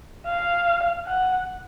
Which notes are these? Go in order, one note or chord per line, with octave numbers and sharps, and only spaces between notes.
F5
F#5